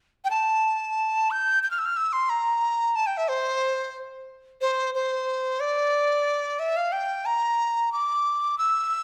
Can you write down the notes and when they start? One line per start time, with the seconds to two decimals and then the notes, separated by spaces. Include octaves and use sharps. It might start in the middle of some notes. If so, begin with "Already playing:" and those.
0.25 G5
0.30 A5
1.31 G6
1.63 G6
1.71 F6
1.79 E6
1.85 F6
1.97 E6
2.13 C6
2.29 A#5
2.95 A5
3.06 G5
3.17 E5
3.28 C5
4.61 C5
4.94 C5
5.60 D5
6.59 E5
6.76 F5
6.92 G5
7.26 A#5
7.92 D6
8.58 E6